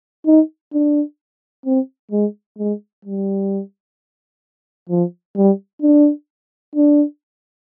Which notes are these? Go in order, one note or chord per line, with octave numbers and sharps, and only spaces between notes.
D#4
D4
C4
G#3
G#3
G3
F3
G3
D4
D4